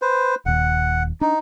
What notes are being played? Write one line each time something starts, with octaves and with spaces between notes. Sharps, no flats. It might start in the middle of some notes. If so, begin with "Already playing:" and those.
B4 C5
D#1 D#2 F#5
D4 D#4